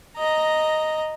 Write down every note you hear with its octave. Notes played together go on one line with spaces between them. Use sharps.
D#5 A#5